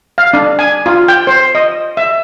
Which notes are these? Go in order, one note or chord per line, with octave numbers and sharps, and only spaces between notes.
F5
D4
G#5
F4
G5
C5
D#5
E5